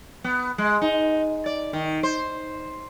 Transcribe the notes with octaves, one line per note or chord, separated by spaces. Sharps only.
B3
G#3
D#4
D5
D#3
C5